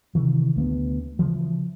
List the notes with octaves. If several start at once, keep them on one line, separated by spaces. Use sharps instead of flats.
C3 D#3 E3
D2 A#3 B3
C#3 E3 F3